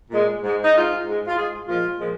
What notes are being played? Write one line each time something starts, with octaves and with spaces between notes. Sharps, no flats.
A#2 G#3
G#2 G#3
D#4
G#2 G#3 F4
G#2 G#3
F4
G#2 G#3 G#4
A#2 F3 G#3 F4
A#2 F3 G#3